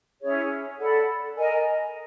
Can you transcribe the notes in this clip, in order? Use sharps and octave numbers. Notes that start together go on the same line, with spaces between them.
C#4 E4 G#4 C#5
A4 D5 F#5 B5
A#4 D#5 G#5